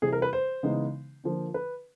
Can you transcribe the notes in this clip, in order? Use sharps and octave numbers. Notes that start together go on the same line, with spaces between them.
C3 E3 G3 G#4
A#4
B4
C5
C#3 E3 G#3 B3 D#4
D3 F3 A#3
B4